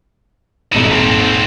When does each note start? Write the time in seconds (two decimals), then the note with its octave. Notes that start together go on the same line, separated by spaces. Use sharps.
0.72 D#1 G#1 D#4 E4 D#7
0.90 G#2 C4